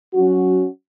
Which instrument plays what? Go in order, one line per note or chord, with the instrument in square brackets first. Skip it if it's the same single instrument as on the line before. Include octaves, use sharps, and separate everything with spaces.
[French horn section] F#3 C#4 F#4